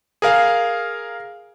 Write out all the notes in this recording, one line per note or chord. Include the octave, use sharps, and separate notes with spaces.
G#4 A#4 F5